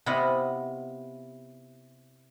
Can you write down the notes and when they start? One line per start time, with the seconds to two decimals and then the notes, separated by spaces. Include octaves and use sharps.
0.06 C3 B3 E4 F4 D#5 F#5